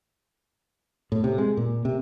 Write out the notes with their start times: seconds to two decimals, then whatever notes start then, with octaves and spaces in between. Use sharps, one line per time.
1.12 A2
1.24 C3
1.38 G#3
1.57 A#2
1.85 C3